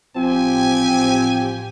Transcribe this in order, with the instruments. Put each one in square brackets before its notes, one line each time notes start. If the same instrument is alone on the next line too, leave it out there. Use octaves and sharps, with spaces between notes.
[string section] A1 G4 [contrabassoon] F3 [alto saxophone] C4 [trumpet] G#5